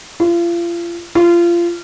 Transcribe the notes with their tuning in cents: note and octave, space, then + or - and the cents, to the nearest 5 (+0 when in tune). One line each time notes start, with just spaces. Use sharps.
F4 -35
F4 -25